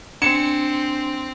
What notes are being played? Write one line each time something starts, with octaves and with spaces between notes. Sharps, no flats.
C4 D4 C#7 E7